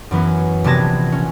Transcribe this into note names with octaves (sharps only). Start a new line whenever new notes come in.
F#2 E3 B3 C#4
A#1 C3 B3 A5 G#6 A#6
C#4